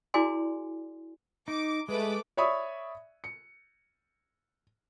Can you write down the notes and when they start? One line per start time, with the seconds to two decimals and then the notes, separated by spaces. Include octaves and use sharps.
0.14 E4 F#4 G#4 D5 G#5 C6
1.48 D#4 D6
1.88 G#3 A3 B4 D6
2.37 C#5 D5 E5 B5 C#6 D#6
3.24 C#7